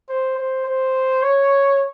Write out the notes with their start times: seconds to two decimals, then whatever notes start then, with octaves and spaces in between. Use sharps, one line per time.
0.09 C5
0.38 C5
0.66 C5
1.22 C#5